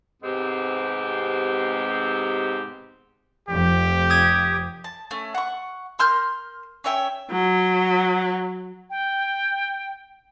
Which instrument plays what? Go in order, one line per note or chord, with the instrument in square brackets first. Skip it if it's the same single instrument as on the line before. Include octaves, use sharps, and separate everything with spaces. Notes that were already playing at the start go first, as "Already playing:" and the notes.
[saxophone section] G#2 C3 G#3 B3 C4 G4
[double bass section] F1 F2 [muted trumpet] G4
[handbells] D#6 G#6
[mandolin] A5
A3 C#4
F#5 C#6
A#4 C6 F6 G6
C#4 C#5 E5 G5
[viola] F#3
[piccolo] G5